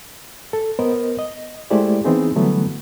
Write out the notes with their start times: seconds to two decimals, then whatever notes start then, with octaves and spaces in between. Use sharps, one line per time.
0.53 A4
0.79 B3 A#4 C5 D#5
1.19 D#5
1.71 G#3 A3 E4 G4 C5 D5
2.05 E3 B3 C4 D#4 G#4
2.35 D3 E3 F#3 G3 A3 B3